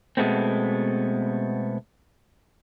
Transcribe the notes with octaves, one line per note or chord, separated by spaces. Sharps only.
B2 G#3 A3 B3 C4